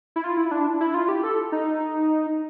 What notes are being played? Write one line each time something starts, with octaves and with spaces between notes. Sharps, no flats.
E4
F4
E4
D4
E4
F4
G4
A4
D#4